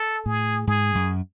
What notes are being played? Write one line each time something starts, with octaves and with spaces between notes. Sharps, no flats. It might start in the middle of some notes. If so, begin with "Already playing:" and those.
Already playing: A4
A2 G#4
G#2 G#4
F#2